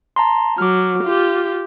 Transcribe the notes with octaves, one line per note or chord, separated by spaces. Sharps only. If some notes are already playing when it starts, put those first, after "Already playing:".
A5 A#5 C6
F#3 D6 F6
F4 G4